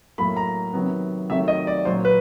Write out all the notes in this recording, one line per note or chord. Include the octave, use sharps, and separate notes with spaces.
A2 F#3 A#3 B5
A#5
C3 D#3 F#3 B3
C3 D#3 F#3 A3 E5
D#5
D5
A#2 F#3 A#3 C5
B4